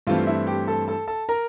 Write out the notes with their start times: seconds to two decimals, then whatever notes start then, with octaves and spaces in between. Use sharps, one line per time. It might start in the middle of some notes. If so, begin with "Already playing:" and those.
0.07 G2 E3 A3 C4 F4 F5
0.27 E4 E5
0.47 G4 G5
0.67 A4 A5
0.88 A4 A5
1.07 A4 A5
1.29 A#4 A#5